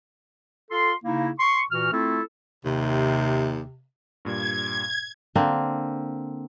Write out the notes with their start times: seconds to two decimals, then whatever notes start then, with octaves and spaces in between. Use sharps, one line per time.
0.71 F4 A4 C6
1.05 C#3 A#3 D#4 E4
1.39 C6 C#6
1.71 A#2 E3 F#4 F6
1.92 A3 C4 E4 F4 A4
2.65 D#2 C3
4.25 G2 A#2 G3 G#6
5.35 D3 A#3 C4